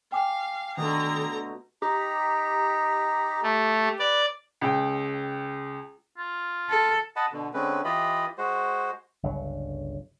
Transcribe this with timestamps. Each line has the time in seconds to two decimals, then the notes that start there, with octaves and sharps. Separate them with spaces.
0.12 F5 G5 G#5 D6
0.77 B2 D3 D#3 A3 A#5
1.82 D#4 G4 A#5
3.43 A3
3.99 B4 D5
4.61 C#2 G5
6.18 F4
6.70 A4
7.16 D#5 F#5 A5 B5
7.32 B2 D3
7.54 D3 G#3 C4 C#4 B4
7.84 E3 F4 G4 D#5 B5
8.38 G#3 F#4 C5
9.23 G1 C#2 F#3